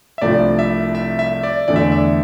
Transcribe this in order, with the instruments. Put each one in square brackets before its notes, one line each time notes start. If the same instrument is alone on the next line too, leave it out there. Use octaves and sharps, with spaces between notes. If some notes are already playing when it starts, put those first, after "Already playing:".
[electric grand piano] E5
[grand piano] C2 C3 F3 A3 D4 [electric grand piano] D5
[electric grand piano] E5
E5
E5
D5
[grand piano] E2 D3 A3 D4 [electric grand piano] D5
[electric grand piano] E5
D5
E5